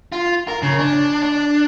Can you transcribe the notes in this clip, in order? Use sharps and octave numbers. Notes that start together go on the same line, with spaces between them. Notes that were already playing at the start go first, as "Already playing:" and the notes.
F4
A#4
C#3
D4
D4